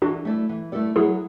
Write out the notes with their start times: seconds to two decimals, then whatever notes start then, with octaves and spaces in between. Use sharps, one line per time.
0.02 E3 D4 F#4
0.25 A3 E4 A4 D5
0.49 E3
0.72 A3 E4 A4 D5
0.96 F#3 E4 G#4